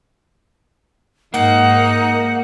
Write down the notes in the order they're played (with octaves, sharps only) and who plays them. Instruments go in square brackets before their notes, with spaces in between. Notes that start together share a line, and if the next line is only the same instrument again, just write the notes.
[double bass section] G#2 [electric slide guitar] A#3 [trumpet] D#4 [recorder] F#5